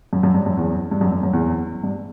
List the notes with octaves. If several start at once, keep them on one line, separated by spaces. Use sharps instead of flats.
F#2
F#2
G2
F#2
E2
G2
F#2
F#2
F#2
E2
G2